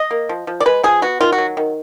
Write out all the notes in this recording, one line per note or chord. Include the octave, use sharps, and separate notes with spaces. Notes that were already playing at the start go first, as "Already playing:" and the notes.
Already playing: D#5
A#3
F3
F3
D5
G#3 B4
F3 G#4
B3 F#4
D#3 F4
F#4
F#3
D#3